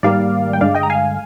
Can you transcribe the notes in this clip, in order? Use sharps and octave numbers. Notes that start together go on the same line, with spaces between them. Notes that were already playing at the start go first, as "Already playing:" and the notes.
G#2 D#3 G3 A#3 D5 F5
G5
G2 D3 G#3 D5 F5
D#5 G5
A#5
F5 G#5